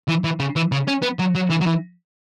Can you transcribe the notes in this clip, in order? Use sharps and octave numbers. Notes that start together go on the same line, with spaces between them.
E3
E3
C#3
E3
C#3
C#4
B3
F#3
F#3
E3
F#3
E3